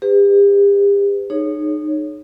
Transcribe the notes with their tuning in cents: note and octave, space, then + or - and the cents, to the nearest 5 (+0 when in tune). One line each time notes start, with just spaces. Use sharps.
G4 +40 B4 +35
D#4 -30 G#4 +10 C#5 +0